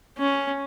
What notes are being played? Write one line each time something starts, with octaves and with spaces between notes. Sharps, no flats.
C#4